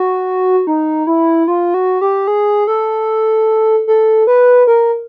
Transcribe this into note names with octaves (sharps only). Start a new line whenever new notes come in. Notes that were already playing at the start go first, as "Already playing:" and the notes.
Already playing: F#4
D#4
E4
F4
F#4
G4
G#4
A4
A4
B4
A#4